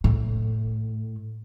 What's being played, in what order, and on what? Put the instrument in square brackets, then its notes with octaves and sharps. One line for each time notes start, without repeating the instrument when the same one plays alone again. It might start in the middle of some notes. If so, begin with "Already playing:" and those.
[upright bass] A2